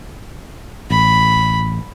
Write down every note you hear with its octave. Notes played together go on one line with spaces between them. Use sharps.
A1 B5